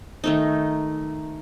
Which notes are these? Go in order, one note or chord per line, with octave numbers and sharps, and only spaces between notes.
D#3 A3 D#4